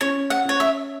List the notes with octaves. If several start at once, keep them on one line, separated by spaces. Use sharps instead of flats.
C#4 C#5
F#5
C#4 C#5
E5